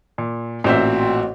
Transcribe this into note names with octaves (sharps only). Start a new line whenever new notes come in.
A#2
A1 A#2 C4 F#4 C5 E5